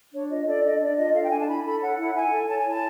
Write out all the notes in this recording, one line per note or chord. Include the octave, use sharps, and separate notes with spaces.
D4 C#5
F4 D#5
A4 D5
D4 D#5
D4 D5
F4 D#5
A4 F5
G5
D4 G#5
A5
E4 B5
A4 B5
C#5 F#5
E4 F#5
E4 G#5
A4
C#5 A5
G#5
E4 A5